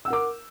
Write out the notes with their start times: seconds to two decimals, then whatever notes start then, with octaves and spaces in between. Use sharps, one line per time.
0.05 E6
0.08 F#5
0.10 A#4
0.13 D6